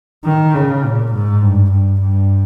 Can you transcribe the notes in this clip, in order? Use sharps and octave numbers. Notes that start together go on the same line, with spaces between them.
D#3
C#3
A#2
G#2
G2
G2
G2